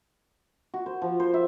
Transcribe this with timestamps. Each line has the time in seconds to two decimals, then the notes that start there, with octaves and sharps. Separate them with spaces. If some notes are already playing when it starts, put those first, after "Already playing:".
0.74 F#4
0.86 C5
1.02 F3
1.20 C5
1.34 E5